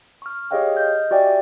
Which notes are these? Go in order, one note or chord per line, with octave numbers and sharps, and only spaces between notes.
C#6 F6
G4 G#4 C#5 D#5 F5 G5
D#5 F6 G6
F#4 G4 D5 E5 G5 G#5